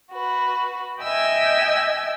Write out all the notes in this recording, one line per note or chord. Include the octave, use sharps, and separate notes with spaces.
F#4 B4
D#5 E5 G5 G#5 E6